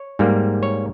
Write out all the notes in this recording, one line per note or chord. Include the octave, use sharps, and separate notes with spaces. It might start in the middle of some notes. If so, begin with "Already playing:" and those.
Already playing: C#5
G#2 G3 A#3
C#5